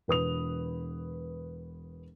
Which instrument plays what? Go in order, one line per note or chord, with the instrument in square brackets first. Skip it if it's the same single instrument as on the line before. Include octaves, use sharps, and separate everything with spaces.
[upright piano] E1 B4 D#6 F7